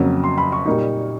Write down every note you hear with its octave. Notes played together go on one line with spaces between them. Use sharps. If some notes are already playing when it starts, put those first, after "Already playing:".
Already playing: F2 C#3 F#3 A#3 C#4
C6
B5
C#6
A#2 G3 A#3 D#4